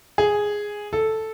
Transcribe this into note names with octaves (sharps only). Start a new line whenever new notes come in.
G#4
A4